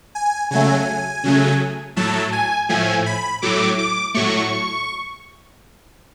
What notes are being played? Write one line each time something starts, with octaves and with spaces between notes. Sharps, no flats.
G#5
C#3 F#3 A3 G#5
C#3 F#3 A3
A2 F#3 A3 A5
G#5
A2 F3 A3 G#5
B5
A2 F#3 A3 D6
D6
A2 F#3 A3 C#6